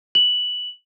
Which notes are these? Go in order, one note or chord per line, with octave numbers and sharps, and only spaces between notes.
F#7